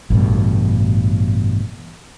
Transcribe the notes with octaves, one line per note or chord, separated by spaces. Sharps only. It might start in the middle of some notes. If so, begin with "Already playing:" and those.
A1 G2 B2